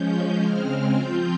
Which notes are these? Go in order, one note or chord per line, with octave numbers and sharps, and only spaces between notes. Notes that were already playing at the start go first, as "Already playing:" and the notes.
Already playing: F3 G#3 C#4 G6
C#3 G#3 C4 F6
F3 C4 F4 G6